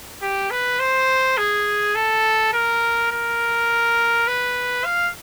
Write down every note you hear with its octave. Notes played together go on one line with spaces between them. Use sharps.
G4
B4
C5
G#4
A4
A#4
A#4
B4
F5